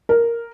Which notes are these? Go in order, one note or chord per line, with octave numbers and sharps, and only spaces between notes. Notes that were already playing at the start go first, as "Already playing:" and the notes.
A#4